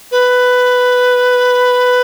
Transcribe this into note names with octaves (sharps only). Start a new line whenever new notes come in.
B4